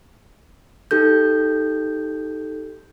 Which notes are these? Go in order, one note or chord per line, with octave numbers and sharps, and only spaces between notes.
D#4 G4 A4 G6